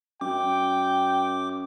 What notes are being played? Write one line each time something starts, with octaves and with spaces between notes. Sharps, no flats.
F#2 G5 D6